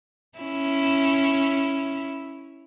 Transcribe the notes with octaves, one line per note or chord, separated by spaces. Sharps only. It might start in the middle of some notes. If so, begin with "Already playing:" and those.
C#4 E4